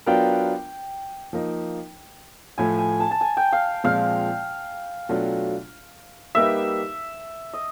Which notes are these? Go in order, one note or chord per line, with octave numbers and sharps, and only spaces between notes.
F#3 B3 D4 F4 A#4 G5
F3 A#3 D#4
A2 F3 A3 G#5
G#5
A5
A5
G#5
G5
F5
A#2 F3 G#3 C4 F5
B2 F#3 A3 D4 F4
G3 A#3 D#4 G4 B4 E5
D#5